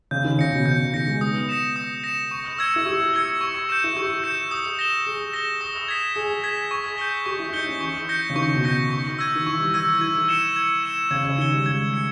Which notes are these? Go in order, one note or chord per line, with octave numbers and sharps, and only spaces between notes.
C#3 G6
D#3
C#3 A#6 C#7
B2
C#3 G6
C#3
D#3 A#6 C#7
G#3
B3 D#6
A#6 C#7 E7
D#6
A#6 C#7 E7
C#6
E6 G#6 C#7 G7
E4
G4 C#6
E6 G#6 C#7 G7
C#6
G6 C#7 E7
E4
G4 C#6
G6 C#7 E7
D#6
A#6 E7 G7
G#4 D#6
A#6 E7 G7
D#6
G#6 B6 E7
G#4 D#6
G#6 B6 E7
C#6
G6 C#7 G7
G4 C#6
E4
D#4 G6 C#7 G7
C#4
E3 C#6
G6 A#6 C#7 G7
C#3
D#3 C#6
B2
G6 A#6 C#7 G7
C#6
E6 G#6 D#7
D#3
E3 C#6
G3
E3
E6 G#6 D#7
E3
E3 G#6
C#7 E7 G7
G#6
C#7 E7 G7
C#3 G#6
C#3
D#3 C#7 G7
G3
G#3 G#6
C#7